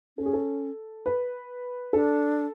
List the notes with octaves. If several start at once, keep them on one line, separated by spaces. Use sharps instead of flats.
C#4 A4
G#4
A4
B4
D4 A4